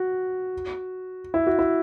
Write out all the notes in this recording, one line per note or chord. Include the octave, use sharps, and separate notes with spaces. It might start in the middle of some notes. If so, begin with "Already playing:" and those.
Already playing: F#4
E4
F#4
E4